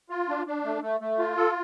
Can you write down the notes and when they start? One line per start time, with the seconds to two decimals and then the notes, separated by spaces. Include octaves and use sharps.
0.10 F4
0.29 D4
0.46 D4
0.64 A3
0.82 A3
1.00 A3
1.19 F4
1.37 A4